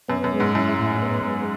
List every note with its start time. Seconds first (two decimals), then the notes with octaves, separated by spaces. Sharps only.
0.08 F#2 B3
0.24 F#2
0.32 G#3
0.40 G#2
0.55 F#2 E4
0.79 A2
1.02 B3
1.25 G#3